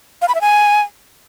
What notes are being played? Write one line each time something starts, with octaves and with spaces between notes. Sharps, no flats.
F5
B5
E5
G#5